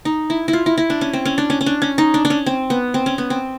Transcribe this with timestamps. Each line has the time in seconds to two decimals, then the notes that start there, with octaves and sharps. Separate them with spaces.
0.05 D#4
0.30 E4
0.48 E4
0.53 F4
0.66 E4
0.78 E4
0.90 D4
1.01 C#4
1.13 C4
1.25 C#4
1.38 D4
1.50 C#4
1.61 C#4
1.66 D4
1.82 C#4
1.98 D#4
2.14 D4
2.25 D4
2.30 C#4
2.46 C4
2.70 B3
2.94 C4
3.06 C#4
3.18 B3
3.30 C4